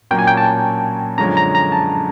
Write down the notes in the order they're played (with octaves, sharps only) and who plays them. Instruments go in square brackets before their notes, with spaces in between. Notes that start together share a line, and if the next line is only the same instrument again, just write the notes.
[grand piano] A#2 F#3 A#3 C#4 [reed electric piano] G5
[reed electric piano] G#5
G5
A5
[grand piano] F#2 D3 F3 G#3 C#4 [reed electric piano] A#5
[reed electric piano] A#5
A#5
A5